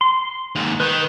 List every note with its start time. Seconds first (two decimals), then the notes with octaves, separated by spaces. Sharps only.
0.01 C6
0.55 D#2 G#2
0.80 D#3 B4